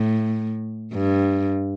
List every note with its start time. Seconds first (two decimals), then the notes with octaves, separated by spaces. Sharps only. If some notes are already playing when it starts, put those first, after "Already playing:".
Already playing: A2
0.94 G2